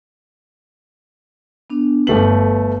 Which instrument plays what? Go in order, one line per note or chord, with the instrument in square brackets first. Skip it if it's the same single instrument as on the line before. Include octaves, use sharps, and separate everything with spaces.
[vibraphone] B3 D4
[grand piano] G1 A3 F#7 [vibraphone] B4